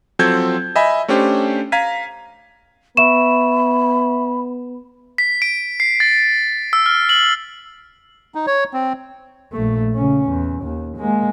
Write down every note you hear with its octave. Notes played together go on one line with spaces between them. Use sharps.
F3 F#3 C4 A4 G6 G#6
D#5 E5 G#5 B5
A3 C#4 D4 G4 C5
F5 A#5 G#6 B6 D#7
B3 E5 B5 C#6 E7
B6
D7
C7
A6
E6
F6
F#7
D#4
C#5
C4
A#1 A3
C#3 C#4
E2
D#2
G#3 A#3